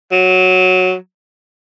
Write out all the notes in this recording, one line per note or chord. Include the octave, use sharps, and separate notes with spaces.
F#3